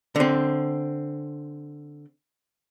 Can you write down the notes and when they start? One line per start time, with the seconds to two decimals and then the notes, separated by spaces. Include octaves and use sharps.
0.16 D3 C4